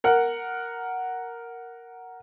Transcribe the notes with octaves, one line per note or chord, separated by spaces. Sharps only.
A#4 F#5